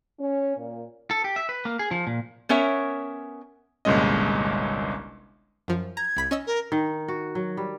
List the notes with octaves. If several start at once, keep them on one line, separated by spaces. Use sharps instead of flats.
C#4
A#2
A4
G4
E5
B4
A#3
G#4
F3
A#2
B3 C#4 A#4 C#5 E5
G1 C2 A#2 G#3 C#4 D#5
F#2 F3
A#5 G#6
C2 B5 B6
C#4 D#5 E6
A#4
D#3
F#4
F#3
G3